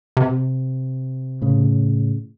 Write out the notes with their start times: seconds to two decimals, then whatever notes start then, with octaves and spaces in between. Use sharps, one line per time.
0.17 C3
1.42 A2 C#3